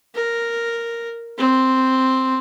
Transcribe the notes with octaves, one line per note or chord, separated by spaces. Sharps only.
A#4
C4